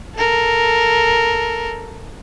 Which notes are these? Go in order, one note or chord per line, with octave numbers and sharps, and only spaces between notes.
A4 A#4